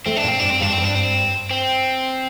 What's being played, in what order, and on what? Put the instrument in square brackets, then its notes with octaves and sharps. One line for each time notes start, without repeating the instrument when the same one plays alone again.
[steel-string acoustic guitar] A3 [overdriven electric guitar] C4
[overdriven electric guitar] D4
[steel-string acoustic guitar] A#2
[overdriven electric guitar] C4
[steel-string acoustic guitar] G2 [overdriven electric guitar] D4
[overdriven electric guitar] C4
[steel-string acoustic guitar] G2 [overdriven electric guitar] D4
[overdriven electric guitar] C4
[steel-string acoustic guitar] G2
[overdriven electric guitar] D4
C4
C4